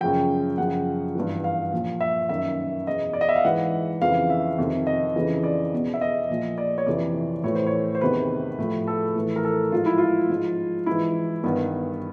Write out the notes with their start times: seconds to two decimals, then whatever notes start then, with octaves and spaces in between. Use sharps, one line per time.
0.01 F#2 C#3 F3 G5
0.58 F#2 C#3 F3 F#5
1.15 G2 E3
1.44 F5
1.73 A#2 F3
2.01 E5
2.29 F#2 D#3 E5
2.87 E2 B2 D#5
3.13 D5
3.21 D#5
3.29 E5
3.36 F5
3.45 G#2 E3 F#5
4.01 F2 C#3 E3 F5
4.30 E5
4.58 F2 C3 D#3
4.87 D#5
5.16 F2 C#3 E3
5.43 D5
5.73 E2 B2
5.94 E5
6.01 D#5
6.30 A#2 F3
6.58 D5
6.78 C#5
6.87 F2 C3 E3 D5
7.43 A2 E3 C#5
7.55 C5
7.67 C#5
7.95 C5
8.01 E2 C3 D#3 B4
8.58 A2 F3
8.87 A4
9.16 A2 E3
9.36 A#4
9.45 A4
9.72 G#2 F3 F4
9.86 E4
9.98 F4
10.30 G#2 F3
10.86 G#2 E3 E4
11.43 G2 D#3 B3